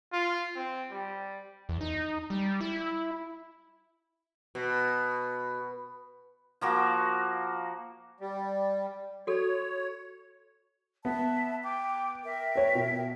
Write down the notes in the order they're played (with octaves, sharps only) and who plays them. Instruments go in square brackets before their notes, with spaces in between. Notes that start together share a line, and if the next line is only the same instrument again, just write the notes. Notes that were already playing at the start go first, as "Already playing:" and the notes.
[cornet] F4
C4
G3
[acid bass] E2
D#4
G3
E4
[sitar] B2
[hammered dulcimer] F3 A#3 F#4
[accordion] G3
[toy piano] F#4 A4 [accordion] C#5
[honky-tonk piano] B3 [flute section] E5 A5
[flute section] G5 D6
A#4 E5 G5
[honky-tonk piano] B4 C#5
B2